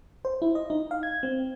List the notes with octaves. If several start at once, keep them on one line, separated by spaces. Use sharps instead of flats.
C5
E4
D#5
D#4
F5
G#6
C4